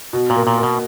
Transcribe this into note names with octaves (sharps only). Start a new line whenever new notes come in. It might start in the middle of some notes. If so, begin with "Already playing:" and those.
B2
A#2
A#3
A#2
A#3
B2